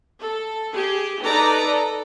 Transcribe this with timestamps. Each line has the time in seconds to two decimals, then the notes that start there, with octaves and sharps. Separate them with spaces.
0.21 A4
0.74 G4 G#4
1.23 D#4 A4 B4 D5 A#5
1.68 A4